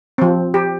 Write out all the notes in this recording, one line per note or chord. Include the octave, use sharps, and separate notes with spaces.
F3 C4
G4